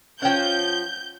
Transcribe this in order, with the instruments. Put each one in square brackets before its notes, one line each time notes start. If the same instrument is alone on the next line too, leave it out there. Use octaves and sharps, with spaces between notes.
[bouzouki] F3 F#5 [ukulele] C#4 C#5 G5 [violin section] G6